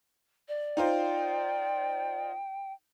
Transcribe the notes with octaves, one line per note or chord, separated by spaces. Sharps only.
D5
D#4 F4 C5 G5